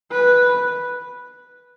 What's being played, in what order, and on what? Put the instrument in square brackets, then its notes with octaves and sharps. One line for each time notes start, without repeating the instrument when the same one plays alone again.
[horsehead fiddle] B4